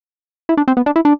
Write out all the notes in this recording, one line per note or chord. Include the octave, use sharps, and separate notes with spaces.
E4
D4
C4
B3
D4
E4
D4